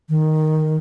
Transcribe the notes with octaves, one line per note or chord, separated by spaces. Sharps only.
D#3